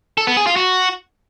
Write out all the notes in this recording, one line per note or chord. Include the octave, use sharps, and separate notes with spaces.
A4
B3
G#4
F4
F#4